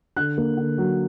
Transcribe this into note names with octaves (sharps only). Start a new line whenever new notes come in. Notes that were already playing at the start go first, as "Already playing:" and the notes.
D3 F#6
A#3
D3
F#3